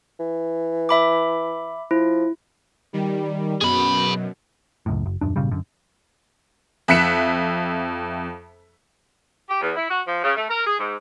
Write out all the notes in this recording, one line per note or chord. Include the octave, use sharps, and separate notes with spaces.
E3
E5 B5 D6
F3 E4
D#3 G3
F#2 B2 G#4 B5
C#2 F#2 A2
F#1
D#1 F#2 D4
G#1 A#2 C#3 G3
F#2 D3
F2 E5 F#6 B6 C#7 E7
G4
E2
E4
F#4
F3
C#3
A3
A#4
G#4
G#2